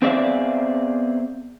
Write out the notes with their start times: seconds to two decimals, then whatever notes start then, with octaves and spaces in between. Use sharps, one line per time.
0.02 B3 C4 G#4 D5 E5 F5